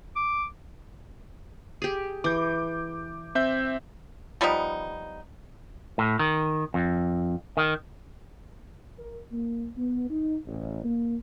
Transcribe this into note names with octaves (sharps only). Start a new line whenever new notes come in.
D6
G4 G#4
E3 D6 G6
C4 E5 G6
F3 G3 B3 D#4
A2
D#3
F2
D#3
A#4
A#3
B3
D#4
A1
A#3